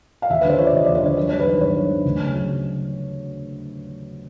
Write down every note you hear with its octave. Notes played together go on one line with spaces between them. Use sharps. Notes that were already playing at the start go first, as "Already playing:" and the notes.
F5
D#2 E5
B4
D3 C5
F3 C#5
D5
D#2 D#5
D5
D#2
C5
D3 C#5
F#3 C#5
C#5
G2
B4
D#3 C5
G1 C#5
F#3
G2
D2
C#3
F#3